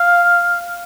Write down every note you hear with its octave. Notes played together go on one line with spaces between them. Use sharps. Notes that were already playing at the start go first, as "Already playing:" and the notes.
Already playing: F5